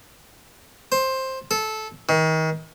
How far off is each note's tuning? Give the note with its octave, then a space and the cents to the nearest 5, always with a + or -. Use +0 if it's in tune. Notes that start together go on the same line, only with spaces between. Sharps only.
C5 +10
A4 -15
D#3 +35